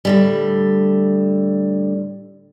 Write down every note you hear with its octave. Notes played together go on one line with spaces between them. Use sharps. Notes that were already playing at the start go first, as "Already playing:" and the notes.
A2 D3 G3